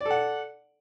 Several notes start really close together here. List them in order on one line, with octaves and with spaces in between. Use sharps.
D5 A4 F#5